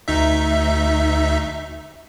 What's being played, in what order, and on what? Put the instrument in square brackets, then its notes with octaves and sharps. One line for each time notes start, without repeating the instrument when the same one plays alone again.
[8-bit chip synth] D2 D#4 E5